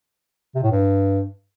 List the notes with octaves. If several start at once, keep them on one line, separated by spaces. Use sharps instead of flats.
C3
A2
G2